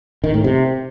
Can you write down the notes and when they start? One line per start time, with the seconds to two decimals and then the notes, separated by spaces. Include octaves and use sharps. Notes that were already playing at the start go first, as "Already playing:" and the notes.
0.24 D#3
0.34 A2
0.44 C3